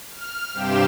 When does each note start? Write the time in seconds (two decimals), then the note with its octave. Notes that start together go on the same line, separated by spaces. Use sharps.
0.10 F6
0.53 G2 C3 G4 F5 G5 E7